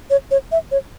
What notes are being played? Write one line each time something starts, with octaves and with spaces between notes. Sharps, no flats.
C#5
C#5
E5
C#5